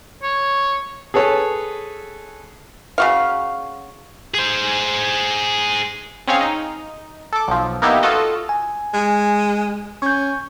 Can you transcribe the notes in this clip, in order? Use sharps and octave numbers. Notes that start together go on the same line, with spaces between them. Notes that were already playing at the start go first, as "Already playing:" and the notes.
C#5
G#4 A4 B4 C#5
C#3 F#4 F5
G#4 C5
C4 C#4 G#4 C#5 F5
D#4
A4 D6
B1 F3
A#3 B3 D#4 E4 G4
F4 F#4 A4 D#5
G#5
G#3
C#4 C#6 G6